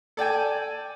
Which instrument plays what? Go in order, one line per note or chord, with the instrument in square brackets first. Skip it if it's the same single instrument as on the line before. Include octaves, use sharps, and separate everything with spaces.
[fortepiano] A4 D5 G5 G#5